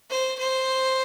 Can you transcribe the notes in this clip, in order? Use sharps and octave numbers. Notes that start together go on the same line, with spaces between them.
C5
C5